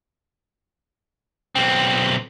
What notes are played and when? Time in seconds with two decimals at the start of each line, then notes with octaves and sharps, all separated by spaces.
1.55 B1 C4